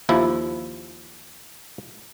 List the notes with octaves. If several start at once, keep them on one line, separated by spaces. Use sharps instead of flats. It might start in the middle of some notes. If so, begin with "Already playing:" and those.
D#2 F3 E4